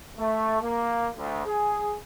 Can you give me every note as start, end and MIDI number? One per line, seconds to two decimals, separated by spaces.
0.17 0.59 57
0.61 1.07 58
1.15 1.42 38
1.46 1.96 68